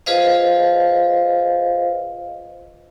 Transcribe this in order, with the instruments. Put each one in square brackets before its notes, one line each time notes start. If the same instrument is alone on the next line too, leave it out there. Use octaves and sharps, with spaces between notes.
[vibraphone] F4 G#4 B4 C5 D#5 F5